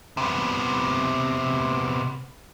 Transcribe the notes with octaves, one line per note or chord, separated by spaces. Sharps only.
C3 B3